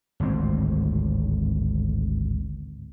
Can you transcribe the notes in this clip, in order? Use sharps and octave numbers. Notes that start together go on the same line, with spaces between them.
G#1 D2 A2 C4